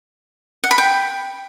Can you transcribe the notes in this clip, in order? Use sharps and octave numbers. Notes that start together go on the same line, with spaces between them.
F#5
B5
G5